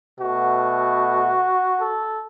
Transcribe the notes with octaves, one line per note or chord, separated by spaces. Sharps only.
B2 A3 F#4
A4